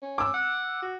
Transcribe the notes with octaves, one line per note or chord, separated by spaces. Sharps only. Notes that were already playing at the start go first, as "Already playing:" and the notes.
C#4
D6 E6
F#5
F#4